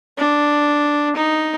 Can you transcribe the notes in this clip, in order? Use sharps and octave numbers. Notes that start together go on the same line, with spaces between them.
D4
D#4